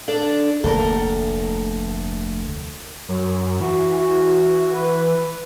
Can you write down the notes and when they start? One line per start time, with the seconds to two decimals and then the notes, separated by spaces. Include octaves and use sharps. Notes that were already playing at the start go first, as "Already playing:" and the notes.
0.08 D4 A4 D5
0.64 F1 D2 A#3 A4 A#4
3.09 F#2 F#3
3.61 E3 F#4
4.00 F#4
4.74 B4